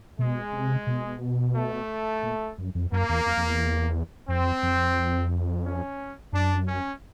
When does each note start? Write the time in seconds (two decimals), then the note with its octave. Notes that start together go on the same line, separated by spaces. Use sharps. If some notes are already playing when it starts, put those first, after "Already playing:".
0.19 B2 G#3
0.53 C3
0.87 B2
1.56 A3
2.23 A#2
2.58 F#2
2.75 F2
2.92 F#2 A#3
3.09 E2
3.26 F2
3.37 F2
3.43 E2
4.28 F2 C4
4.63 F2
5.65 C#4
6.33 F#2 D4
6.67 C#4